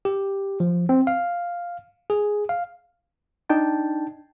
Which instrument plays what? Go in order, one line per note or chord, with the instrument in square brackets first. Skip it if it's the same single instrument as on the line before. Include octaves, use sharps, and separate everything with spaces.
[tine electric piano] G4
F3
C4
F5
G#4
F5
[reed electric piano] D4 D#4 G5 A5